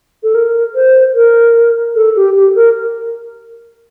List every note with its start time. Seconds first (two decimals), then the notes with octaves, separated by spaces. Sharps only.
0.23 A4
0.35 A#4
0.75 C5
1.14 A#4
1.96 A4
2.16 G4
2.35 G4
2.55 A#4